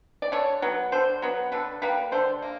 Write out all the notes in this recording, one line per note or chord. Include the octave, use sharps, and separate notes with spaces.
D5
D3 C#5
F#3 B3
D3 C5
F#3 B3
D3 B4
G3 A#3 B4
D3 C5
A#3